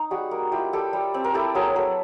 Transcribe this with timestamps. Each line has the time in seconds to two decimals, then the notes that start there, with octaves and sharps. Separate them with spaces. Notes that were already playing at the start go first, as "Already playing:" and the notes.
Already playing: D#4
0.11 G3 F#4 G#4
0.31 A#3
0.52 E4 F4 G4
0.73 G3 G4 A4
0.93 G3
1.14 C4
1.24 A#4
1.34 E4 G4 A4
1.55 F#3 G#4 A#4
1.76 F#3 A4 B4